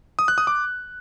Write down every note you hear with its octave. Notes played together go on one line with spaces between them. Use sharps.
D#6
F#6
D#6
D6